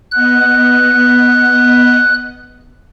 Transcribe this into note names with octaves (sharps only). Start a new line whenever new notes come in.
B3 D#5 F#5 F#6